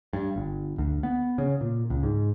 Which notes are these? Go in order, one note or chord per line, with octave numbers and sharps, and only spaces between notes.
G2
G1
D2
B3
C#3
A#2
C#2
G#2